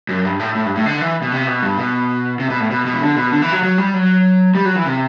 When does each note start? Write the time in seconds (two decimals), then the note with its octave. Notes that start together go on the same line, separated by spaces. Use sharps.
0.09 F#2
0.25 G2
0.40 A2
0.55 A2
0.65 G2
0.76 A2
0.86 D3
1.01 E3
1.22 B2
1.32 C3
1.47 B2
1.63 G2
1.78 B2
2.40 C3
2.50 B2
2.60 A2
2.70 B2
2.86 B2
2.94 E3
3.01 D3
3.16 B2
3.32 D3
3.42 E3
3.52 F#3
3.63 F#3
3.78 G3
3.94 F#3
4.55 G3
4.65 F#3
4.76 E3
4.85 C3